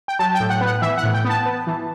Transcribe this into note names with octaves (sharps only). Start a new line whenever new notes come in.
G5
F#3 A5
G5
A2
F#5
B3
F#5
E3 E5
F#5
A2
G5
B3 A5
B3
E3